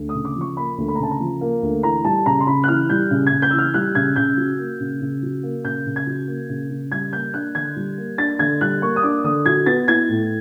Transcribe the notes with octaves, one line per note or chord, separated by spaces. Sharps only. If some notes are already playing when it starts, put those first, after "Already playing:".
Already playing: D2
C#3 D#6
D6
F3
C#6
A#3 B5
D2
B5
A#5
C#3 A5
A#5
F3
A#3
D2
E3 A#5
G3 A5
C#3 A#5
C6
C#3 B5
F#6
E3 F6
G3 G6
C#3
G#6
C#3
G6
E3 E6
F6
G3 F#6
C#3 G#6
C#3 G6
F#3
A#3
C#3
C#3
F#3
A#3
C#3 G6
C#3
G#6
F#3
A#3
C#3
C#3
G3 G#6
A#3 G6
D4 F#6
D3 G#6
G3
A#3
D4 A6
D3 G#6
G3 F#6
A#3 C#6
D#6
D4 D6
D3 D#6
F#3 G#6
B3 A6
E4 G#6
A2